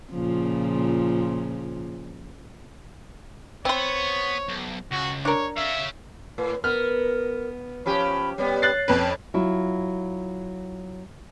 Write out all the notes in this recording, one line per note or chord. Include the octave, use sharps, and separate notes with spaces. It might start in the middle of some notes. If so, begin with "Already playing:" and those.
A#2 C#3 F3
B3 C4 C#5 C6
B1
C#2 F#4
D4 A#4 C#5
C#5 E5 F5
A2 B4
B3 A#4 F6
F3 C#4 G4 B5
G3 B3 C#5
F#6 A6 C7
F2 C#4 B4
F#3 E4 F4